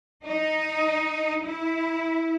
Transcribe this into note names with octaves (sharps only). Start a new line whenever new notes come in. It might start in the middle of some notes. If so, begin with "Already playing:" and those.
D#4
E4